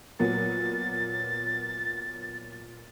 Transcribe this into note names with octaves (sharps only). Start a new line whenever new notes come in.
A#2 F#3 B3 A6